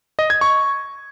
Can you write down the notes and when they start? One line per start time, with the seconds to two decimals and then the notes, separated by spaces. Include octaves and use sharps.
0.19 D#5
0.30 G#6
0.41 C#6